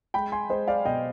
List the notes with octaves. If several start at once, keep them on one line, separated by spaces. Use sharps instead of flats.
G#3 G5 B5
G#5 C6
G#3 C5 D#5
D5 F5
B2 D#5 G5